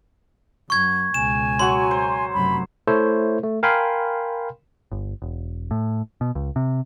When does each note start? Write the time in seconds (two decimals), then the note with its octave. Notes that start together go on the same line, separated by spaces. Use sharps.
0.70 F#2 C#6 G#6
1.14 C#2 B2 G#5 E7
1.59 F#3 F#4 C6 C#6
1.91 C5
2.33 F1 F#2 B5
2.87 A3 E4 A4 C5 C#5
3.44 A3
3.63 A#4 F5 G5 G#5 B5 C6
4.92 G1
5.22 E1
5.71 A2
6.21 B2
6.35 C#2
6.56 C3